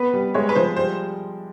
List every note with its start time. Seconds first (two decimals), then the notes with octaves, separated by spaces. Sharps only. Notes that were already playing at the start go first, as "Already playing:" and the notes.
Already playing: B3 B4
0.14 G3
0.34 G#3 C#5
0.49 B4
0.55 F3 C5
0.76 G3 C5